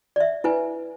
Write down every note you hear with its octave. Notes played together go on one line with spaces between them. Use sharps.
D5 E5
E4 B4 G#5